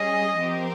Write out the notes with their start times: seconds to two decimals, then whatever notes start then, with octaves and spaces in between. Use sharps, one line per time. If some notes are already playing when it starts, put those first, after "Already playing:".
Already playing: G3 C#4 G#4 D#5
0.38 F3 C4 G4 A#4